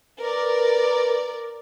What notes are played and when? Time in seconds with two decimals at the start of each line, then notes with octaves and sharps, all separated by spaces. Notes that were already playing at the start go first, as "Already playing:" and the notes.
0.19 A#4 B4 D5